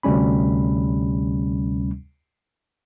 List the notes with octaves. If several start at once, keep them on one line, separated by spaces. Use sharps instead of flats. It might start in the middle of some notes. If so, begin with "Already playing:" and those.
D2 C3 G3 C#4 B5